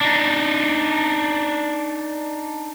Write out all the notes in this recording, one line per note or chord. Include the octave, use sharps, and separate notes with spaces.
D4 D#4